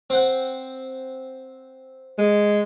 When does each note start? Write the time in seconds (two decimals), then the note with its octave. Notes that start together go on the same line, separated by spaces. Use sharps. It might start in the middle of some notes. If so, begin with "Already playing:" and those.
0.10 C4 F#5
2.18 G#3